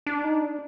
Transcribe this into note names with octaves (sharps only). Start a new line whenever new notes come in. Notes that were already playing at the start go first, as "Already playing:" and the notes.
D4
D#4
D4